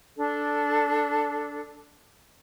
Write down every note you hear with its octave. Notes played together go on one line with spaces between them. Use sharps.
D4 A4